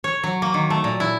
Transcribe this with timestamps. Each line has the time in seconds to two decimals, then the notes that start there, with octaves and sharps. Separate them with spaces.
0.04 C#5
0.23 F#3
0.42 A#3
0.54 D#3
0.70 A3
0.84 A#2
1.00 E4